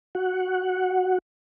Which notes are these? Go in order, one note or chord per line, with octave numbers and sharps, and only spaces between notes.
F#4 F#5